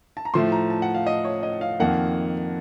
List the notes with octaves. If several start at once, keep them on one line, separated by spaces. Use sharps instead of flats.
A5
A#5
A2 F3 A3 C6
A#5
A5
F#5
F5
D#5
C#5
D#5
F5
F2 D#3 A#3 F#5